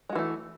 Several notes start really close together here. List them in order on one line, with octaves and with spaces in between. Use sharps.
G#3 F#4 E3 A3